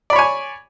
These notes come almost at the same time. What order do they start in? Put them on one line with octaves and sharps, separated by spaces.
D5 B5 C#5 G#5